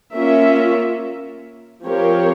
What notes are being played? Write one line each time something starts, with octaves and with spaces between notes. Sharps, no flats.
A#3 C#4 F4 A#4 E5
F3 C4 G4 A#4 C#5